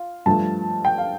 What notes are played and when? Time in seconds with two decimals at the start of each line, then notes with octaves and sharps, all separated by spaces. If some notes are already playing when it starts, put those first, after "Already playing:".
Already playing: F4
0.26 G2 F3 A3 A5
0.85 G5
0.98 F5